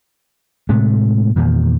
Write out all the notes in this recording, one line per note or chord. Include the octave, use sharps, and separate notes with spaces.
A2 C3 G#3 A3
E2 A#2 D#3